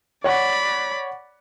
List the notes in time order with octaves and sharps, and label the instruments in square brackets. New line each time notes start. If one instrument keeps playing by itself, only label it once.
[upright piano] C#5 F#5 C#6 [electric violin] D5 B5